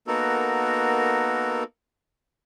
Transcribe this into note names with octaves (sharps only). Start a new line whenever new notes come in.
A#3 B3 D#4 F#4 A4 A#4